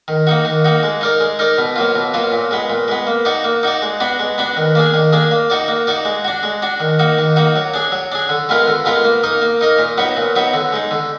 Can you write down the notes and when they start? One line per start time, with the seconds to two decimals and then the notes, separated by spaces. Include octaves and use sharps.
0.08 D#3
0.27 A#3 D#4 F#4
0.45 D#3
0.65 A#3 D#4 F#4
0.83 G#3
1.01 D#4 A#4 D5
1.20 G#3
1.39 D#4 A#4 D5
1.58 B2
1.76 F#3 A#3 F4
1.96 B2
2.14 F#3 A#3 F4
2.32 A#2
2.51 G#3 B3
2.70 A#2
2.88 G#3 B3
3.07 A#3
3.25 D#4 F#4 D5
3.44 A#3
3.63 D#4 F#4 D5
3.82 G#3
4.00 B3 D4 F#4
4.19 G#3
4.38 B3 D4 F#4
4.57 D#3
4.75 A#3 D4 G#4
4.94 D#3
5.13 A#3 D4 G#4
5.31 A#3
5.50 D#4 F#4 D5
5.68 A#3
5.87 D#4 F#4 D5
6.05 G#3
6.25 D4 F#4
6.43 G#3
6.62 D4 F#4
6.80 D#3
6.99 A#3 D#4 F#4
7.18 D#3
7.36 A#3 D#4 F#4
7.56 F#3
7.74 D4 G#4
7.92 F#3
8.12 D4 G#4
8.29 D3
8.49 G#3 B3 F4 A#4
8.68 D3
8.85 G#3 B3 F4 A#4
9.04 A#3
9.24 D#4 A#4 D#5
9.41 A#3
9.61 D#4 A#4 D#5
9.79 A#2
9.98 F#3 B3 D#4 F#4
10.17 A#2
10.36 F#3 B3 D#4 F#4
10.54 D3
10.73 G#3 D#4
10.91 D3